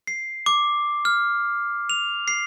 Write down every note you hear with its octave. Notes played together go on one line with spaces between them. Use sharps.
C7
D6
F6
F7
C7